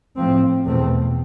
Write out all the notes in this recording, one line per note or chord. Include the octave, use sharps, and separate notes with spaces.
A2 F3 C4
E2 B2 A3 C4